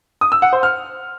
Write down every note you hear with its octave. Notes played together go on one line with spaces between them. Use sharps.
D#6
E6
F#5
C5
F6